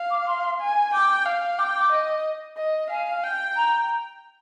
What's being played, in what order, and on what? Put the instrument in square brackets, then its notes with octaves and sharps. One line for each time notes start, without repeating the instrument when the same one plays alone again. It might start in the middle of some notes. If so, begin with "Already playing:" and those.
Already playing: [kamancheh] F5
[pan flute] D6
C6
[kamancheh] G#5
[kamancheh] G5 [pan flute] D6
[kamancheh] F5
[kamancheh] G5 [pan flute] D6
[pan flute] D6
[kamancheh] D#5
D#5
[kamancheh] F5 [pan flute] G#5
[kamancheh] G5
[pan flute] A#5